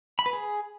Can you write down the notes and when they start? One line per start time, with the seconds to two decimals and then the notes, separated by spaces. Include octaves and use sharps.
0.19 B5
0.26 B4
0.33 G#4